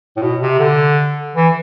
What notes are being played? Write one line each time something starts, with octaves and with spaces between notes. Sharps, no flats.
A2
B2
C3
D3
E3